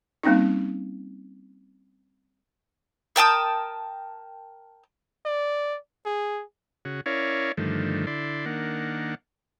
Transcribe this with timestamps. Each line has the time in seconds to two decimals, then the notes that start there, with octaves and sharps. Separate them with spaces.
0.23 G3 A#3 C4 C#4 D#4
3.16 A#4 G5 A5 D#6
5.26 D5
6.05 G#4
6.85 C#3 F#4
7.06 C#4 E4 A#4 C#5 D5 F5
7.57 G2 D3 D#3 F3 A3
8.07 D3 E4 D5 C6
8.46 D#3 A#3 D4 F#5